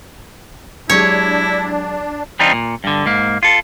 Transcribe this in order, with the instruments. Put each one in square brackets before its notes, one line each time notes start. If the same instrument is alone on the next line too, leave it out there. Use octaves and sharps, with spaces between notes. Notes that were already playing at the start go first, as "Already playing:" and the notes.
[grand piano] F#3 G#3 G4 [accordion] D4 [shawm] E4 [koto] C#5
[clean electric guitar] E3 G3 C4 D4 D#4 F4
A#2
G2 D3
G#2 A#3
F4 A4